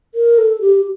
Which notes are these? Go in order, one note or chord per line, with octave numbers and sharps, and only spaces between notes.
A#4
A4
G4